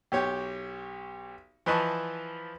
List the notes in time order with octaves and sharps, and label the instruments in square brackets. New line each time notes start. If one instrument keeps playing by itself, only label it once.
[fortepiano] B1 G4 C#5 G5
E3 F3 B4 D#5 A5 C#6